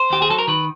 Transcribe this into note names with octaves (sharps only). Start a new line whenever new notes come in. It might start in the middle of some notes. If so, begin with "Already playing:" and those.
Already playing: C5
D#2 G4
G#4
F#3 A4
A#4
D#3 B4